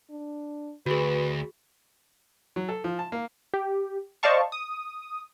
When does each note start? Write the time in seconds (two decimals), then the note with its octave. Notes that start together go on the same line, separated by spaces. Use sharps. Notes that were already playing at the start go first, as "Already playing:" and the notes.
0.10 D4
0.86 D2 F#4 G#4 B4
2.56 F#3
2.69 A4
2.84 F3
2.99 A5
3.12 A#3
3.54 G4
4.23 C5 D5 D#5 F5 A5 C#6
4.52 D#6